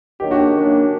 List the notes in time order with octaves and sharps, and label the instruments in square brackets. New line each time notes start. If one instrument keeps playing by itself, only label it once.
[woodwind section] D#3 F#3 A#3 D4 [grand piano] G4
[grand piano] F#4
G#4
[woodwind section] D#3 F#3 A#3 D4